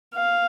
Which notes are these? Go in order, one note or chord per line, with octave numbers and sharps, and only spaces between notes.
F5